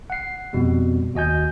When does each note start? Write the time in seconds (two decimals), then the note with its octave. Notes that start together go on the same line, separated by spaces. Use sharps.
0.10 F#5 C7
0.53 F2 B2 G3
1.14 D#2 F#4 D#5 G#5 G6